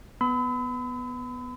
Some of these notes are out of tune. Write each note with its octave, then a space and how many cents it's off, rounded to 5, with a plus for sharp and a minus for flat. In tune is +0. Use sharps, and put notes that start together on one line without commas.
B3 +0 B5 +35 E6 -40